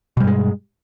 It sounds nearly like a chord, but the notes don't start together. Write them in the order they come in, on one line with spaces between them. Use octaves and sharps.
B2 G3 G2 G#3